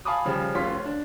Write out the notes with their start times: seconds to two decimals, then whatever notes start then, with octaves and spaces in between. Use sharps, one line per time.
0.05 F5 G#5 A5 B5 D6 D#6
0.25 C#3 F3 G3 G#4
0.55 F1 C#4 F4 C6 B6
0.85 D4